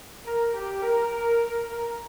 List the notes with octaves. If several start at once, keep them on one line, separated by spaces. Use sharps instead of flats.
A#4
G4
A#4
A#4